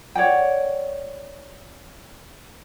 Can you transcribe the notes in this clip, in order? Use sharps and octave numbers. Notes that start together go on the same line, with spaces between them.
C#5 D5 F#5 G5